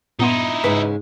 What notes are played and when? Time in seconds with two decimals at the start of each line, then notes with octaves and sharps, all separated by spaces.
0.19 G2 A#2 B3 D#4 E4 C6
0.64 G#2 C#3 G#3 B4